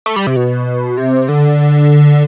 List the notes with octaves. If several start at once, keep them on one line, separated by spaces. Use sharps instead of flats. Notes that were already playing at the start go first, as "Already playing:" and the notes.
A3
G3
C3
B2
C3
D3